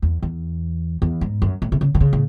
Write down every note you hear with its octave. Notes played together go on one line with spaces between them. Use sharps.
E2
E2
E2
G#2
F#2
A2
C3
C#3
D#3
C#3
A2